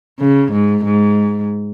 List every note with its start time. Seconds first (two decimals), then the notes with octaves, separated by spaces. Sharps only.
0.20 C#3
0.52 G#2
0.84 G#2